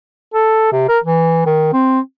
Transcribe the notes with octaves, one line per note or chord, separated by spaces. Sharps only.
A4
C3
A#4
E3
D#3
C4